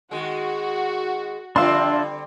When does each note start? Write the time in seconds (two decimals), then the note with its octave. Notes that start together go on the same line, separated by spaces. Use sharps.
0.11 D#3 G#3 F#4
1.56 D3 F3 G3 C4 D4 E5 F5 C6